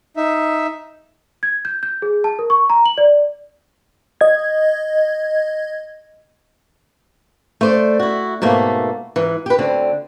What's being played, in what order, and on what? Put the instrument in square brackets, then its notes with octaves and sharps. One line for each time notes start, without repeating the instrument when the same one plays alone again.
[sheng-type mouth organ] D#4 E5
[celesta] G#6
G6
G6
G#4
A5
A#4
C#6
A#5
F#7
D5
[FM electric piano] D#5 G#6
[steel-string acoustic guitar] A3 C5 D5
E4 F#4
G#2 B2 A3 A#3
G#2 E3
G4 B4
D2 D3 C4